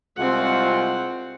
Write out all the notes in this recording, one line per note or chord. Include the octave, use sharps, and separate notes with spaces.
C2 G#3 C4 F4 F#5